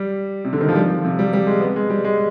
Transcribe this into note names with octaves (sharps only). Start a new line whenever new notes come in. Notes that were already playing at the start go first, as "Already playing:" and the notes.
Already playing: G3
C3
D3
D#3
F3
G3
F3
C3
G3
G3
G#3
B3
G#3
G3
G#3